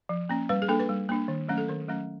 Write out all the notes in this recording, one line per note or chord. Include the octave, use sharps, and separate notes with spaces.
F3
A#3 C#4
G3 B4
G#4
A#3 D4 A4
B4
G3
A#3 D4
D#3
F#3 A3 C#4
A4
D#3 A#4
F#3 A3 C#4